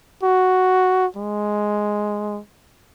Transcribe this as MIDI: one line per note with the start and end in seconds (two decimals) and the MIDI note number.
0.23 1.06 66
1.16 2.40 56